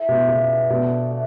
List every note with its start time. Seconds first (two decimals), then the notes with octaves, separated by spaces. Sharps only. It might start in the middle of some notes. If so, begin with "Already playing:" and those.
Already playing: E4 A4 C#5 E5
0.08 B2
0.28 C#3 E4 B4 D5
0.69 B2 D4 A4 D5
1.11 A3